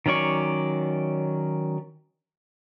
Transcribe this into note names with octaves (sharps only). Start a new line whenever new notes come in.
D#3 F#3 C#4 D5 C#6